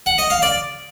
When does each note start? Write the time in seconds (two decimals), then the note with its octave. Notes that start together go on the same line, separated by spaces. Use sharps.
0.06 F#5
0.18 D#5
0.30 F5
0.42 D5